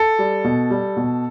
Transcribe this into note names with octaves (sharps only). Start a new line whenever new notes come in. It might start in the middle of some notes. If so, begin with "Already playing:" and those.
Already playing: A4
G3
B2
G3
B2